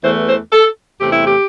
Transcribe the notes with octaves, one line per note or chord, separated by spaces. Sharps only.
E2 E3 A3 C5
C5
A4
E2 C3 A3 G4
E4
G4